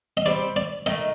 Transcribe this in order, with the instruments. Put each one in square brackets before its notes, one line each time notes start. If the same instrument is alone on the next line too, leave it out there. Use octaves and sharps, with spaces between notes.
[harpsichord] D#5
[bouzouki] G3 C4 G4 C5 [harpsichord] D5
[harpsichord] D5
[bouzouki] D#3 A3 D#4 [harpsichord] D#5